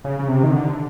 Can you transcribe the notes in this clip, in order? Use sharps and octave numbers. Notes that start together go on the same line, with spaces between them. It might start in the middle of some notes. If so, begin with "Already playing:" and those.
C#3
C#3
C3
D#3
D3